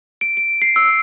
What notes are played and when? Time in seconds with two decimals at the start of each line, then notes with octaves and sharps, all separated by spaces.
0.21 D7
0.37 D7
0.62 C7
0.76 E6